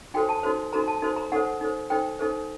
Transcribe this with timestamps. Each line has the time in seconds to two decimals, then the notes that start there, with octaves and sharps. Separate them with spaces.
0.14 D#4 F#4 A4 C5 G5
0.29 A5
0.43 D#4 F#4 A4 C5
0.73 D#4 F#4 A4 C5 A#5
0.88 A5
1.02 D#4 F#4 A4 C5
1.16 A#5
1.32 D#4 A4 C5 F#5
1.61 D#4 A4 C5
1.90 D#4 A4 C5 G5
2.19 D#4 A4 C5